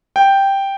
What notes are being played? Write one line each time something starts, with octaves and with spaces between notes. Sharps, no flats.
G5